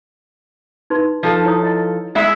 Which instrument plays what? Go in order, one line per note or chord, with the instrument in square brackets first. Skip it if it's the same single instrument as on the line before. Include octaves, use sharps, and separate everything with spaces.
[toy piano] D#4 B4 C6
[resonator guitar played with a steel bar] F3 A4
[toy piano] E4 C#5 D#6
D#5
[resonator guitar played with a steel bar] G#3 E4 E5